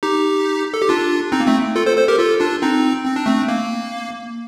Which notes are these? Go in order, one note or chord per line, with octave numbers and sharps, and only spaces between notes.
D#4 G4
A4
G4
D4 F4
C4 D#4
A#3
A3 C4
F4 A4
A4 C5
A4 C5
G4 A#4
F4 A4
D4 F4
C4 D#4
C4
D4
A3 C4
A#3